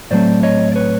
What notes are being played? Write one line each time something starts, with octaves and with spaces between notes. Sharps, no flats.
A2 F#3 A3 C4 C5 D5
C#5 D#5
D5
B4 C#5